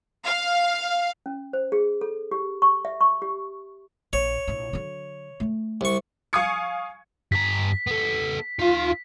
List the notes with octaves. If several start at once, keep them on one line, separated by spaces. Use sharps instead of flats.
F5
C#4
C5
G#4
A4
G4
C#6
E5
C#6
G4
A#1 C#5
A#1 E4
D3 F#3
A3
C2 C#6
F5 G#5 C#6 D#6 G#6 C#7
G2 A#5 B6
B3 A4
D#4 F4 F5